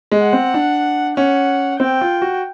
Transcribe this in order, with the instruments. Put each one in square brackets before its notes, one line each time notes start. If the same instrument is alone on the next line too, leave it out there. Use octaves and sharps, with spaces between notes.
[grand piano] G#3
[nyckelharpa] F#5
[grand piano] C4
D4
[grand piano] C#4 [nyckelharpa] F#5
[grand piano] C4 [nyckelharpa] G5
[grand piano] F4
F#4